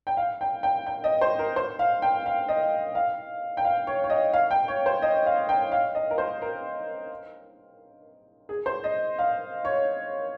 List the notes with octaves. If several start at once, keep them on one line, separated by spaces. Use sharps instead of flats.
G5
F5
G5
G5
G5
D#5
C5
A#4
C5
F5
G5
F5
D#5
F5
G5
F5
C#5
C#5
D#5
F5
G5
C#5
C5
D#5
F5
G5
F5
D#5
A#4
C5
A#4
G#4
C5
D#5
F5
C#5